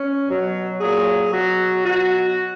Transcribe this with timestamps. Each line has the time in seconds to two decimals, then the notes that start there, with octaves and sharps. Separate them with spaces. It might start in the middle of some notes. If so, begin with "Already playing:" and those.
Already playing: C#4
0.29 B2 F#3
0.80 A#2 F#3 G#4
1.32 B2 F#3 F#4
1.84 B2 F#3 F#4